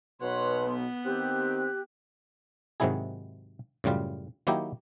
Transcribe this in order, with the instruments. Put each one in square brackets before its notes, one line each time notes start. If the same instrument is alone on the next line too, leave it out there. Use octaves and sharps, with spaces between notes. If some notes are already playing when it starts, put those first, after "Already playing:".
[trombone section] B1 B2 [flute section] B4 C6 [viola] C#5 F#5
[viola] B3
[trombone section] D#3 C4 [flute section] G4 F#6
[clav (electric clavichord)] G#2 C3 D#3 F#3 E4 G#4
F#2 A2 C#3 G3 F4
D#3 F#3 A#3 D#4 E4 G4